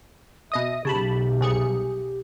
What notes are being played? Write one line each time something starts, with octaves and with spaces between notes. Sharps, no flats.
B2 D#5 E5 D#6
B1 C#3 G4 A5 B5
C2 G#4 C#7